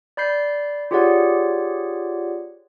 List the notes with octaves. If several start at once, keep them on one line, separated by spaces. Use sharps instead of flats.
D5 B5 G6 C7
F4 G4 G#4 C#5 D5 F#5